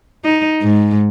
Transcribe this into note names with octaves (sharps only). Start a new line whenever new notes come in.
D#4
G#2